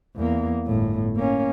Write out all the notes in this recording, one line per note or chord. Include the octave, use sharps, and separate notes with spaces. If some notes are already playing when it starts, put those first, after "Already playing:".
E2 A#3
G1 A2
A#3 C#4